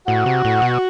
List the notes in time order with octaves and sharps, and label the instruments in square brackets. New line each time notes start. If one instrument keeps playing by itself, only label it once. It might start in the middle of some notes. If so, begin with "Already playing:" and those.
[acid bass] A2 [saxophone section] F#4
[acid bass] C3
A2
B2